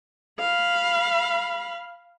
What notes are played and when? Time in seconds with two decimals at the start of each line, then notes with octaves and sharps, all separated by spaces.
0.39 F5 B5